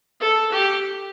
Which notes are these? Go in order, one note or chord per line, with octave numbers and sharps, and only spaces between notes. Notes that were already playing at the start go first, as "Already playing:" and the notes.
A4
G4